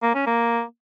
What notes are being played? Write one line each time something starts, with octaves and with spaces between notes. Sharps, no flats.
A#3
C#4
A#3